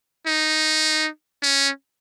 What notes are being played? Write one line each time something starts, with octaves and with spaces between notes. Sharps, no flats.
D#4
C#4